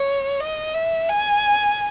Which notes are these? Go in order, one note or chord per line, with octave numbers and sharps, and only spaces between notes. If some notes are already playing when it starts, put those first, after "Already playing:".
Already playing: C#5
D#5
E5
G#5